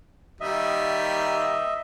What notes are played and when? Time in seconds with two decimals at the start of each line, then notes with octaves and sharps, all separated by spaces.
0.41 D#3 G3 A#3 D#5 E5